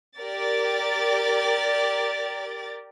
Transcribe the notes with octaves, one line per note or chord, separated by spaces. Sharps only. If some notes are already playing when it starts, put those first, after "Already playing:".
G4 A#4 D5 A6